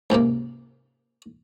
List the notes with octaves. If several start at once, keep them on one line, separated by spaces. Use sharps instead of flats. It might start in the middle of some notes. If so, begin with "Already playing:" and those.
C#2 G#2 C3 A#3